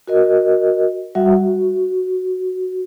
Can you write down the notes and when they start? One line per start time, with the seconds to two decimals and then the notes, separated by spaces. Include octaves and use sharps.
0.08 F#4 A#4 D#5
1.15 G3 F#4 E5 F#5
1.36 F#4